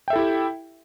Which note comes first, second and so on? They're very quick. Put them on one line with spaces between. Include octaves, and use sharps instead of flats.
G5 E5 A4 E4 G4